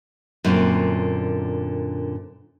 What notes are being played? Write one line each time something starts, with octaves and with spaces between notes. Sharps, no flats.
F#2 A#2 D3 C4